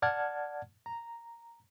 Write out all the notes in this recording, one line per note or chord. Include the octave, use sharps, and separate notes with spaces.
D5 F#5 A5 F6 G#6
A#5